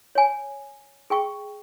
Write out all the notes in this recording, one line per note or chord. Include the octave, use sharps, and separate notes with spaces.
C#5 G#5
G#4 G5 C#6